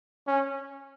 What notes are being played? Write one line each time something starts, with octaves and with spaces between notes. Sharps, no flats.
C#4